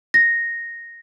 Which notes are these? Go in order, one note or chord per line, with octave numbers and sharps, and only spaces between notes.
A#6